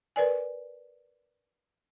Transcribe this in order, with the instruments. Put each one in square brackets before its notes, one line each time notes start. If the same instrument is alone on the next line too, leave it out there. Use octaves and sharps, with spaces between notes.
[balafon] A#4 B4 D5 G#5